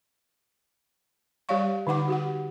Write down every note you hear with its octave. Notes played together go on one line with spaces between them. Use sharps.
G3 G4 C#5 D5 F5 C#6
D3 D#4 F#5 D6
F#4 G4 F#5